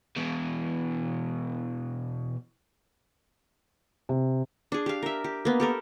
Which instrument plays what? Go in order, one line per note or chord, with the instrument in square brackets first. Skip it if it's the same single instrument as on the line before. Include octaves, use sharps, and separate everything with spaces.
[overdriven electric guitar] B2 E3
[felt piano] C3
[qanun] D4 G#4
G4 F5
A#4 E5
G4
A#3 B3
G4 A4 A#4